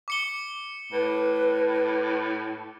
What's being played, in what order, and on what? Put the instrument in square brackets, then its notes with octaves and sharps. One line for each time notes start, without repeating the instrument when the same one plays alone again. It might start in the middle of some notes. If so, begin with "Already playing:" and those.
[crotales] D6 C#7 G7
[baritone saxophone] A2 [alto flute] B4